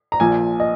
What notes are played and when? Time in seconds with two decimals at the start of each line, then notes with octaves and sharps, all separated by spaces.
0.12 A#5
0.20 A#1 A#2 F3 G#5
0.60 D#5